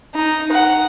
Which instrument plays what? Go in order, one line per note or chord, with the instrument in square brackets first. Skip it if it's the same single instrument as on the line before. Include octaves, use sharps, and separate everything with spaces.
[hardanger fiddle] D#4
F#5